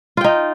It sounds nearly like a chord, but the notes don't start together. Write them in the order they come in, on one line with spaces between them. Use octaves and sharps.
F4 G5 D#4